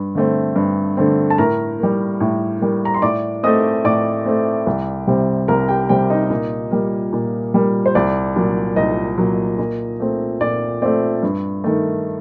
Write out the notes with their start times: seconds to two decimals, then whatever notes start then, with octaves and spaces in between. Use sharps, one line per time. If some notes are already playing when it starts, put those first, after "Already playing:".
Already playing: G2
0.15 D3 A3 C4
0.56 G2
0.97 D3 A3 C4
1.30 A5
1.38 A2 A#4 A#5
1.79 G3 A#3
2.20 A2
2.61 G3 A#3
2.85 A#5
2.94 C6
3.02 A2 D5 D6
3.43 A3 C4 D#5 D#6
3.84 A2 D5 D6
4.26 A3 C4
4.67 C2
5.07 C3 G3 C4
5.48 C2 A#4 A#5
5.68 G4 G5
5.89 C3 G3 C4 G4 G5
6.10 D#4 D#5
6.30 A#2
6.71 G3 A#3
7.13 A#2
7.54 G3 A#3
7.86 C5
7.95 C2 D5
8.36 A#2 F#3
8.76 C2 D#4 D#5
9.18 A#2 F#3
9.58 A#2
10.00 A3 C4
10.41 A#2 D5
10.82 A3 C4 D5
11.23 G2
11.64 D#3 A3